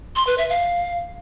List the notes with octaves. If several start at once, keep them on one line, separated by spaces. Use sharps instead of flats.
C6
B4
E5
F5